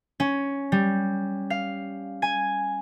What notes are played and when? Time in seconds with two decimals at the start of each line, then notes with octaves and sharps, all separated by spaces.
0.20 C#4
0.72 G3
1.50 F5
2.22 G#5